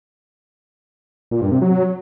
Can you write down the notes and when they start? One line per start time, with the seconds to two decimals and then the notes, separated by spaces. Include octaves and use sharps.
1.31 A#2
1.41 G2
1.51 C3
1.62 F#3